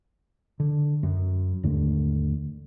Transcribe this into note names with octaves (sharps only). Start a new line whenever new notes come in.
D3
F#2
D#2 G#2 D3 A3